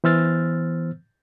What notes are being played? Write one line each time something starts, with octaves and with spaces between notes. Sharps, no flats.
E3 B3 C5 E6 F6 A6